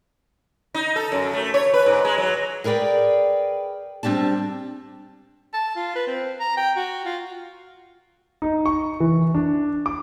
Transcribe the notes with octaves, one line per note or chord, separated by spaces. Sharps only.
D#4
A4
F#2
A3
C#5
B4
G#2
G#3
F#3
G#4 A#4 B4 D5 G5
G3 C4 D4 G4 A5
A5
F4
B4
C4
A#5
G5
F#4
F4
D#4
C#6
E3
D4
D6